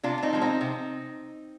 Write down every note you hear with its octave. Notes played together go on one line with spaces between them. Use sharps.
C3 D4 F4
D4
C4 D#4
F3 G#3
C4 D#4
C3